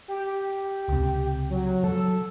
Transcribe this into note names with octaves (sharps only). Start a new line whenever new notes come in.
G4
C#2 C3
F#3
F#3 A4